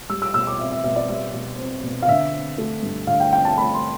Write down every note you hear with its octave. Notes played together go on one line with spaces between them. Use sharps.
G3 E6
E6
B2 E6
D6
C4 E5
E5
B2 E5
D5
G3 E5
B2
C4
B2
F5
D3 E5
C4
A3
G2
D3 F5
G5
C4 G5
A5
A3 B5
C6